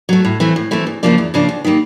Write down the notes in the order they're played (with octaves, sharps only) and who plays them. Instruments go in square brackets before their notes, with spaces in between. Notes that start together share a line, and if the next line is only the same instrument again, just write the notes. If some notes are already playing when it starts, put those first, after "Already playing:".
[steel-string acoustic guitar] F#3 A3
A2
E3 A3 C4
A2
E3 A3 C4
E2
C#3 F3 A#3 D4
E2
C#3 F3 A#3 D4
D#2
D#3 G3 A#3